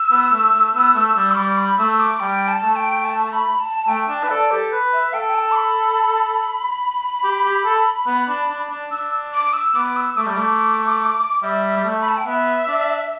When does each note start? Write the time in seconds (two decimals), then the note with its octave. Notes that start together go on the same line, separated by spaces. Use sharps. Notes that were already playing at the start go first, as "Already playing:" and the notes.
Already playing: E6
0.11 B3
0.32 A3
0.53 A3
0.74 B3
0.95 A3
1.16 G3
1.32 B5
1.36 G3 D6
1.58 B5
1.78 A3 E6
2.00 D6
2.20 G3 G5
2.48 A5
2.63 A3
2.76 G5
3.05 A5
3.33 B5
3.60 A5
3.88 A3 G5
4.09 D4 A5
4.23 B4
4.29 A4 D5
4.51 G4 A4
4.72 B4
4.93 E5
5.14 A4 G5
5.28 G5
5.35 A5
5.51 D6
5.56 B5
7.24 G4
7.45 G4
7.65 A4
8.07 B3
8.28 D4
8.49 D4
8.70 D4
8.91 D4 E6
9.34 D6
9.53 E6
9.75 B3 D6
9.96 E6
10.17 A3 D6
10.26 G3
10.36 A3 D6
11.43 G3 E5
11.77 G3
11.84 A3
12.01 B5
12.09 A5
12.17 G5
12.26 B3 E5
12.68 D4